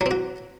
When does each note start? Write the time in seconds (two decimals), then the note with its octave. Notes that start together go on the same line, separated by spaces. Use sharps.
0.01 F#3
0.06 C4
0.11 F#4